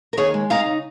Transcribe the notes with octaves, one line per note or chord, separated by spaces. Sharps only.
A#4
D#2 G#4 C#5
G#3
D#4 F5 A#5
C#3